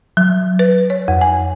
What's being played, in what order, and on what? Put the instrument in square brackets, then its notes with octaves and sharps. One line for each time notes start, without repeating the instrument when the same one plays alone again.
[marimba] F#3
B4
C#5
F2
G#5